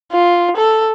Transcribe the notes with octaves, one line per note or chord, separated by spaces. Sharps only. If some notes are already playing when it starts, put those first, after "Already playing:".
F4
A4